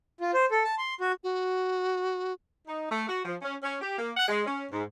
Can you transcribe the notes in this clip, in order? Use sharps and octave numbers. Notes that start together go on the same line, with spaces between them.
F4
C5
A4
A5
C6
F#4
F#4
D#4
A3
F#4
F3
C#4
C#4
G4
A#3
F#5
G#3
C#4
G#2